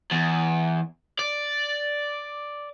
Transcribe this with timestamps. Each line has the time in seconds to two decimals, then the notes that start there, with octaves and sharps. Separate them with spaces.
0.12 E2
1.19 D5